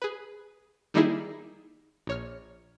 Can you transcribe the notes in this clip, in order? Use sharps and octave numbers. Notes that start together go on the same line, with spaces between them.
G#4 B4
D#3 G3 A#3 D#4 E4 G#4
A#1 C#5 F6